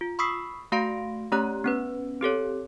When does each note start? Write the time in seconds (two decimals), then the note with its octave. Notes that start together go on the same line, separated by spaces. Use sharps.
0.01 F4
0.19 B5 C#6 D#6 E6 B6 C7
0.72 A3 F#4 F5 C6 A#6 D7
1.32 A3 C#4 G4 C#5 A#5 F#6
1.64 B3 C#4 B4
2.21 C4 G4 A4 C#5